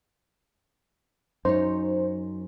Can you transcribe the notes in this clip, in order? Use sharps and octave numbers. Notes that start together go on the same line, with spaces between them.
F#2 D#4 C5 C#5